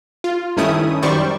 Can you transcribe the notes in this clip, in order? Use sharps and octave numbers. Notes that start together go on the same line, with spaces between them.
F4
G2 D#3 A3 C#4 E4 D#6
F#2 D#3 G3 C5 D5 C#6